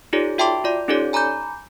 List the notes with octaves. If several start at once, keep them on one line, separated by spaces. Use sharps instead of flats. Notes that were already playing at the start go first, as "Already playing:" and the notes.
D#4 F4 G4 A4 C#5 D5
F#4 E5 G5 A5 C6 D6
F4 D5 C6
C#4 D#4 G4 A4 C#5 D5
G#5 A#5 B5 D6 G6